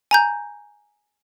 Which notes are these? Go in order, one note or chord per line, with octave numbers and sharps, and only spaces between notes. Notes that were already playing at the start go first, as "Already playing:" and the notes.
G#5 A#5 G6